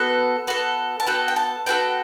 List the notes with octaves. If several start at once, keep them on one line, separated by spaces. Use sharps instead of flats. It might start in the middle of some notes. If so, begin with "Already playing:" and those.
Already playing: B3 F#4 A4
B3 F#4 A4
A5
B3 F#4 A4 G5
G5
A5
B3 F#4 A4 G5